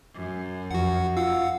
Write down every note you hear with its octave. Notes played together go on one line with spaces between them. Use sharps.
F#2
F2 F#4 F#5
F4 F5 F#5 E6